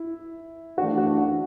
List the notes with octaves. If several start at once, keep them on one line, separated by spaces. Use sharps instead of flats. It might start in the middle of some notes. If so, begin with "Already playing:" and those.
Already playing: E4
E3 A3 D4 F#4
F#4
F#4